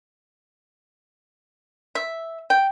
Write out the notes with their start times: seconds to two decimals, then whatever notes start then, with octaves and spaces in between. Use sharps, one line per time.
1.95 E5
2.50 G5